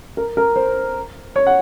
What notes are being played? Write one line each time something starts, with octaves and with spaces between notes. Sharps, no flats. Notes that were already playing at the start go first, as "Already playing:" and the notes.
A#4
A#4
C5
C#5
F#5